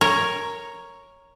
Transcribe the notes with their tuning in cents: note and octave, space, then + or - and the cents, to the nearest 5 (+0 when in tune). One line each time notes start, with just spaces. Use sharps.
A#4 +0 C#5 +0